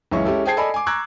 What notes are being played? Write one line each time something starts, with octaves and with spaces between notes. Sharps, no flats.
C#2 F#2 E3 C#4 E4 C#6
G#3 C#4 E4 G4 A4
G#4 C5 G5 A5 G#6 C7
A4 D5 D#5 G#5 B5
G#5 D6
A#5 C#6 D6 E6 F#6 G#6